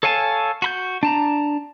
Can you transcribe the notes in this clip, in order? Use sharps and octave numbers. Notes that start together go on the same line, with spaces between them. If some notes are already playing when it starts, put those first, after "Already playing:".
A4 C#5 F5 G#5 A5
F#4 B5 G6
D4 A5 A#5